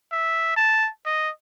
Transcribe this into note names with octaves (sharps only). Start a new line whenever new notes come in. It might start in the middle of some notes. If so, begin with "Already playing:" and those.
E5
A5
D#5